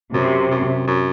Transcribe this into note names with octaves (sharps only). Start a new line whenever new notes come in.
F#2 C3
F#2
F#2